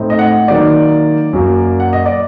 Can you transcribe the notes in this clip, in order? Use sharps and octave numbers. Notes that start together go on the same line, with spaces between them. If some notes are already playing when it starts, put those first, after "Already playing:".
Already playing: A2 A3 C4 D#4
D#5
F#5
D#3 F#3 A#3 D#4 D5
F#2 F#3 A#3
F#5
D#5
D5